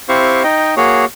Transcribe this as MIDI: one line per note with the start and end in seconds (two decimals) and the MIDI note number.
0.09 0.43 60
0.09 0.43 64
0.09 0.43 67
0.09 0.43 72
0.09 0.43 77
0.09 0.43 85
0.44 0.75 63
0.44 0.75 75
0.44 0.75 79
0.77 1.05 58
0.77 1.05 66
0.77 1.05 68
0.77 1.05 73